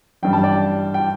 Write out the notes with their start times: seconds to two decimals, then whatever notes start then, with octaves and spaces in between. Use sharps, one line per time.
0.23 A1 G2 G3 G5
0.33 A5
0.43 D5 G5
0.94 G5